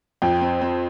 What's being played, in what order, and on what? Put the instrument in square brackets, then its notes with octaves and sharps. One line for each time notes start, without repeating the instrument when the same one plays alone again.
[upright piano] F2 [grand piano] G5
[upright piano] C4
C4